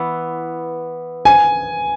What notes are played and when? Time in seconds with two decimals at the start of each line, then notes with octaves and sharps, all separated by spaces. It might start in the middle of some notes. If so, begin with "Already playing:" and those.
Already playing: E3 B3
1.25 G#5